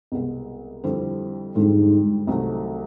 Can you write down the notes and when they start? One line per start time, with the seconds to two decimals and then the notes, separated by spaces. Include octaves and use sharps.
0.12 C2 B2 G#3 B3
0.84 F2 D3 G3 C4 E4
1.55 F2 G#2 D3 G3
2.27 C2 C3 D#3 F#3 A3